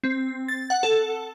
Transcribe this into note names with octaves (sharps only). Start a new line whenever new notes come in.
C4
A6
F#5
A4